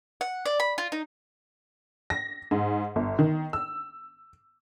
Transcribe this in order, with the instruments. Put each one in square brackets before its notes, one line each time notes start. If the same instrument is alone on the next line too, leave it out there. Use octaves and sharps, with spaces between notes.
[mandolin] F#5
D5
B5
F4
D#4
[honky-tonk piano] A#6
G#2
G1
D#3
E6